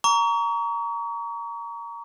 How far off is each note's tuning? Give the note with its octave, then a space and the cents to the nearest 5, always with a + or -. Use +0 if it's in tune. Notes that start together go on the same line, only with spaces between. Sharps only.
A#5 +0 C#6 +35